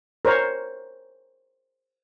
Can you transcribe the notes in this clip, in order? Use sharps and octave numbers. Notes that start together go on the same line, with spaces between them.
A#4 C5 C#5 A#5